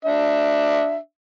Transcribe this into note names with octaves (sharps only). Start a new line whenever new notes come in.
D4 E5